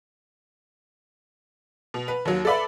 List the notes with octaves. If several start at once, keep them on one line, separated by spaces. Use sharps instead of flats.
B2
B4
D#2 F#3
A4 B4 D5 E5 B5